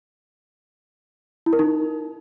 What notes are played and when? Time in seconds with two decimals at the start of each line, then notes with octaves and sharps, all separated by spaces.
1.46 E4
1.53 A#4
1.59 D#4